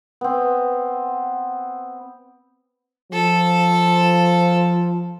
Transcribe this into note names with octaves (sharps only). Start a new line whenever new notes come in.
B3 C4
F3 A4